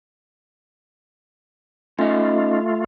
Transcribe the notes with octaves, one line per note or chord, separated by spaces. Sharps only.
A3 C#4 D#4 F4 D#5